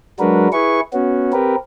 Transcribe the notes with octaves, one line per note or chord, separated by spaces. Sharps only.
F#3 G#3 D4 F#4 A#4 B4
E4 G#4 B4 C#6
B3 C#4 F#4
C4 G4 A#4 B4